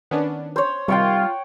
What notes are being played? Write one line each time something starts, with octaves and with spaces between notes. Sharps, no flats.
D#3 B3 C#4 D4
C5 C#5
C3 D#3 G3 F4 F#5 G5 C#6